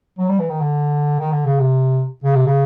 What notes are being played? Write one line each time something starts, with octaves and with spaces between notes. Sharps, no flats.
F#3
G3
E3
D#3
D3
D#3
D3
C#3
C3
C#3
C3
C#3